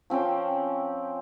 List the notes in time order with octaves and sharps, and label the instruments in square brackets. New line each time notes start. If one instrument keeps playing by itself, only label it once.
[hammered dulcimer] F3 C4 C#4 G5